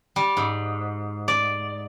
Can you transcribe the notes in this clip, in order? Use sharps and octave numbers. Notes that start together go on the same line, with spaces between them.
G3
G#2
D5